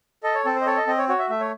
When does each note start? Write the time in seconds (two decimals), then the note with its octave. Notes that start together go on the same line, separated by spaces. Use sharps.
0.23 A4 D#5
0.35 C#5
0.45 C4 A4
0.55 C5
0.61 D#5
0.66 A4 C#5
0.77 D#5
0.87 C4 D#5
0.98 C#5
1.09 F#4 C#5
1.19 E5
1.30 A3 E5
1.41 C#5